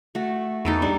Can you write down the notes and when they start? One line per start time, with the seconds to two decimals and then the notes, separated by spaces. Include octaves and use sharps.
0.15 A3 F#4
0.65 E2 D#4 A4 A#4
0.82 G3 D4